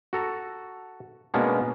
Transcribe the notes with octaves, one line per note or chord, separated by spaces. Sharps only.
F#4 A4 A#5
B2 G#3 A#3 B3 C#4 D4